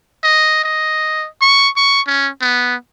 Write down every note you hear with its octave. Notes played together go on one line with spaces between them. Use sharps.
D#5
D#5
C#6
C#6
C#4
B3